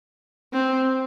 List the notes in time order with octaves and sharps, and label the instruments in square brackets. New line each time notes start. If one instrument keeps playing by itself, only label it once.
[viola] C4